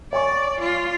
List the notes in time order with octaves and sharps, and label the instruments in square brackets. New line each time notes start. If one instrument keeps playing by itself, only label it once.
[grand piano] C#5 G#5 C#6 [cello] D5
[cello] F4